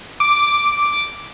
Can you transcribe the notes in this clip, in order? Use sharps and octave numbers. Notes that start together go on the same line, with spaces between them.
D6